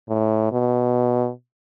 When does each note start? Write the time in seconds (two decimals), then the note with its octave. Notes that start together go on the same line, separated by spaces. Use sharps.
0.08 A2
0.52 B2